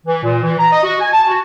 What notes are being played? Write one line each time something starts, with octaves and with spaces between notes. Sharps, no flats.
E3
A#2
E3
A#5
D#5
F#4
G#5
A5
F#4